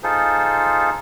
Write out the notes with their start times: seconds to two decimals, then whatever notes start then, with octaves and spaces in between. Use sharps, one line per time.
0.03 D#4 F4 G#4 A4 C5